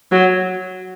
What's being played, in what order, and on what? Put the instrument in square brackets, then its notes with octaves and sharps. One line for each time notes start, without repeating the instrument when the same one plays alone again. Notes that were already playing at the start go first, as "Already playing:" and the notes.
[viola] F#3